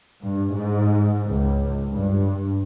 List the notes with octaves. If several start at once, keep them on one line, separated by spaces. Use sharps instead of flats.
G2
G#2
C#2
G2